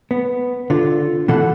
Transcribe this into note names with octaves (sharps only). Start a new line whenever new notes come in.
B3
D3 F4
B2 E3 A4 F#5